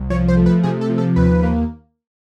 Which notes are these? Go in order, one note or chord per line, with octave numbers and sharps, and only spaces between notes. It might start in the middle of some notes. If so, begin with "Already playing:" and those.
Already playing: C2
F3 C#5
C5
A3
B4
C3 G#4
A4
F3
A4
D#2 B4
A#3